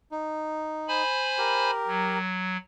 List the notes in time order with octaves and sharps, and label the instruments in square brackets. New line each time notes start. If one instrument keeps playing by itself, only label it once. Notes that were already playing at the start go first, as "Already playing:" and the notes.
[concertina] D#4
[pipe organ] C5 G#5 B5
[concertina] G4 A#4
[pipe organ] F#3